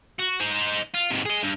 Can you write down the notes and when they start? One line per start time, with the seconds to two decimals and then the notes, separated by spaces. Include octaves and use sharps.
0.19 F#4
0.40 D#4 C5
0.95 F4
1.11 G#2 C3
1.26 G#4 D#5
1.43 G2